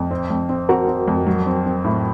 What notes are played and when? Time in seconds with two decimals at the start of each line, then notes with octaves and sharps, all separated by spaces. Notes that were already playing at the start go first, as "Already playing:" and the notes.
Already playing: F2
0.11 C4
0.30 F2
0.49 C4
0.69 C4 F#4 A#4
0.88 C4
1.08 F2
1.26 F#3
1.46 C4
1.66 C4
1.84 A2